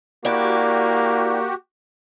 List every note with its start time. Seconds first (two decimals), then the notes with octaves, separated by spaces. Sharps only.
0.25 A#3 E4 F#4 G4 D5